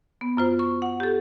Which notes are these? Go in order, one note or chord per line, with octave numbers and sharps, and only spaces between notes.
B3
F#2 F4 C5
C#6
F#5
G4 A4